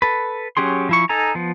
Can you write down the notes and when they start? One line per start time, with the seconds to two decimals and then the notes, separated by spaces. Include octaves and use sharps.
0.02 A4 B4
0.57 F#3 C#4 G4 G#4 C6
0.89 F3 E4 C#6
1.09 D#4 A4 G#5 A#5
1.35 F3 B3